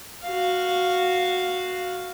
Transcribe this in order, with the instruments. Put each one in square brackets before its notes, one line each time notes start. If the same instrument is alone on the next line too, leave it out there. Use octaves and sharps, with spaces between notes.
[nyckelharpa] F#4 F5